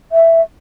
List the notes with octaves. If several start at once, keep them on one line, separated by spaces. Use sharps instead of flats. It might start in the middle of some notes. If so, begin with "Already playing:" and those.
E5